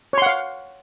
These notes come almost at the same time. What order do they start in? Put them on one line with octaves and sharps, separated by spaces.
C#5 C6 F#5 F5